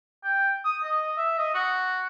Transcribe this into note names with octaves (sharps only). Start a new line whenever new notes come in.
G5
D#6
D#5
E5
D#5
F#4